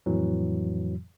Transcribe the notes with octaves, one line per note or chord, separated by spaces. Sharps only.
F2 A2 E3 F#3